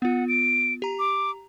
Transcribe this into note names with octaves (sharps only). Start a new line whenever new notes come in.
B3 F4 F#5
D7
G4 A#5
D6